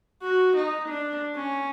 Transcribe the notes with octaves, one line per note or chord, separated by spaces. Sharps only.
F#4
D#4
D4
C#4